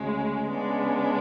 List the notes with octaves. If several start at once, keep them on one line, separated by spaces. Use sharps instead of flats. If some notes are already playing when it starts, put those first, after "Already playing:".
Already playing: D2 C#3 G#3
C#3 G#3 B3 D4